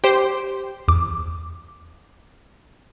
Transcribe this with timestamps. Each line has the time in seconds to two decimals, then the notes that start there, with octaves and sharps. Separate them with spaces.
0.04 G4 C5
0.88 E2 D6